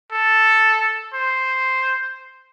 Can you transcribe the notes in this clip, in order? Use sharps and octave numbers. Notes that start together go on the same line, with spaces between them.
A4
C5